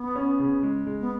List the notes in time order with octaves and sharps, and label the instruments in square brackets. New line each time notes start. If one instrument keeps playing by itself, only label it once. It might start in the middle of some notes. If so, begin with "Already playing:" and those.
Already playing: [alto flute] B3
[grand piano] C#4
C#3
G#3
G#3
[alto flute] B3